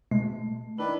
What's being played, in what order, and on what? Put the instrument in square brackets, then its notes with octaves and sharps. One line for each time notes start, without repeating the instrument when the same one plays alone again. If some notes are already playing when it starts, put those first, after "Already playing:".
[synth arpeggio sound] B2 G#3 [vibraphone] A3
[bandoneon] D#3 D4 B4 [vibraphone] E4